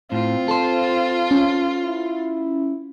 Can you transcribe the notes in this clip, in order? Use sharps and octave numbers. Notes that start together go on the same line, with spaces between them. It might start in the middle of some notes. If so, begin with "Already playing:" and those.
A2 C4 F4
A4 C5
C#4
E4